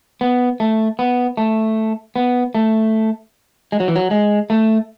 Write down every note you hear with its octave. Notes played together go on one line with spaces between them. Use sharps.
B3
A3
B3
A3
B3
A3
G#3
F#3
E3
F#3
G#3
A3